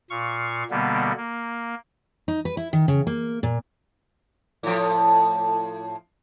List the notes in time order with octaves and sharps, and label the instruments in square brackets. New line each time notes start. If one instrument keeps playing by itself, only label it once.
[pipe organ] A#2 F5 C#6
B2 D3 G3 A#3 B3
A#3
[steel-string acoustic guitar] D#4
B4
E4
D#3
C#3
A#3
A#2
[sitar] A2 F3